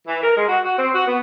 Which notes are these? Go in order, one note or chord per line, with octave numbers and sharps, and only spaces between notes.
E3
A#4
G#3
F#4
F#4
C4
F#4
B3